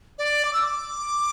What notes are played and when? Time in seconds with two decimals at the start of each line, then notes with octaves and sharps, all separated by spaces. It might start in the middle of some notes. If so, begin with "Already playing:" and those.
0.18 D5
0.45 D6
0.53 E6
0.62 D6